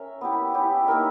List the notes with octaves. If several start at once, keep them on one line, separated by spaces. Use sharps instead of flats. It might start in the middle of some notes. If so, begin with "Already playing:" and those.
Already playing: C#4 A#4 E5
B3 E4 G4
C#4 E4 G4
A#3 D#4 A#4 E5